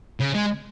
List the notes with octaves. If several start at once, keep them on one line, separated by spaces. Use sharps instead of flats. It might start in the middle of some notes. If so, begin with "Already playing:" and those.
C#3
G#3